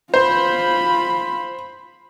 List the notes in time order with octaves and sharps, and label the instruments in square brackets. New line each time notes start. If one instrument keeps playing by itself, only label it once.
[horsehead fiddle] F4 B5 [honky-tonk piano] C5